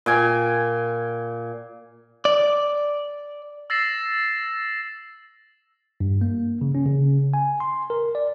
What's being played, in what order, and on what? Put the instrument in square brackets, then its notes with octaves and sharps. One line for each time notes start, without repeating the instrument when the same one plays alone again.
[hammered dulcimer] A#2 G5 G#5
[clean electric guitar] D5
[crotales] E6 A6 A#6 C7 E7
[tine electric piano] G2
A#3
C#3
C#4
C#3
G#5
C6
A#4
D5